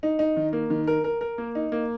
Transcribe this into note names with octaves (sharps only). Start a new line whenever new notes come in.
D#4
D#4
D#3
A#3
D#3
A#4
A#4
A#4
A#3
D#4
A#3